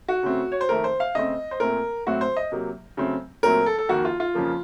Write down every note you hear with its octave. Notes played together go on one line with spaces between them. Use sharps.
F#4
C#3 A3 C4
C#5
C5
F2 D#3 A3 A#4
C5
F5
C#3 A3 C4 D#5
C5
A#2 A3 C4 A#4
A2 F#3 A3 C4 F#4
C5
D#5
C3 F#3 A#3
C#3 F#3 A3 C4
A#2 F#3 A3 C4 A#4
A4
A4
F2 D#3 A#3 F#4
F4
F4
F2 C#3 F3 A#3